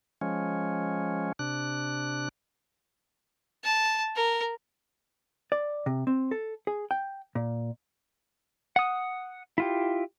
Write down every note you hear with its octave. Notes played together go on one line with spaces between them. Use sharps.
F3 G#3 C#4
C3 D4 F#6
A5
A#4
D5
C3
C4
A4
G#4
G5
A#2
F#5 D#6
E4 F4 G4